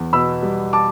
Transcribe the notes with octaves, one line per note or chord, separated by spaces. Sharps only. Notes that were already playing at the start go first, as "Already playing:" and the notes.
Already playing: E2
B2 B5 E6
G3
A5 D6